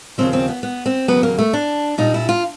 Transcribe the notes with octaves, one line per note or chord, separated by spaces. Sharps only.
D#2 C#3 F3 C4
C4
B3
B3
C4
D#2 C#3 F#3 B3
A#3
A3
D4
A#2 G3 D#4
E4
F4